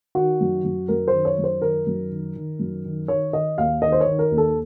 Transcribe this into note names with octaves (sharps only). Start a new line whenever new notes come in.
D#3 F#4
F#2
F#2
F#2 A#4
C5
D#3
C#5
F#2
C5
D#3 A#4
F#2
D#3
D#3
F#2
D#3
D#3 C#5
D#3 D#5
D#2 F5
D#3 D#5
C5
C#5
D#3
A#4
D#2
A4